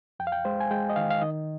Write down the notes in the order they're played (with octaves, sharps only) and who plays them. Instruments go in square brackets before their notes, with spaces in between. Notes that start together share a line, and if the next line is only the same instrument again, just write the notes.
[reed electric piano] F2 G5
F5
G5
G#3 C5
G#5
G#3 G5
D#5
D#3 F5
F5
D#3 D#5